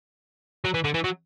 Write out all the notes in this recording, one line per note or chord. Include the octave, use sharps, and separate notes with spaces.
F#3
E3
D3
E3
F#3